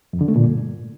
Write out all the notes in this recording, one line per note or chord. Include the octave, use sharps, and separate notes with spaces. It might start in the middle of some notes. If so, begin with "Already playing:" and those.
F2
D3
A3
A#2
G2